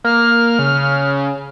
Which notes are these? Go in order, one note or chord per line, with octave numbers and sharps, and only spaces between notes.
A#3 F6
C#3